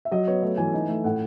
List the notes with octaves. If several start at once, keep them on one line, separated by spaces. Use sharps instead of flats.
E5
F#3 D#5
B3 C#5
A3 C#5
E3 G#5
D#4 G#5
A3
A2 F#5